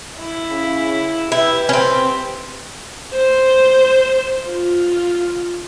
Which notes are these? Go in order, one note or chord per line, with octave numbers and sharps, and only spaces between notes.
E4
C#3
E4 G4 B4
C4 C#4
C5
F4